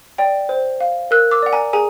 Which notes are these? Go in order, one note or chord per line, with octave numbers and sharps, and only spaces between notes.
D5 G5
C5
F5
A#4 E6 F#6
D6 E6
D5 F#5
G#5 A#5
G#4 G#5 A#5